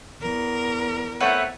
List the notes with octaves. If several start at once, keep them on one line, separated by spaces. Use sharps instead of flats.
E2 A#4
A3 C4 B4 C#5 E5 F#5